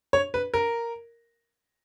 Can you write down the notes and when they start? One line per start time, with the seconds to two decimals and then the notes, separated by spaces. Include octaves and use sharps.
0.13 C#5
0.34 B4
0.54 A#4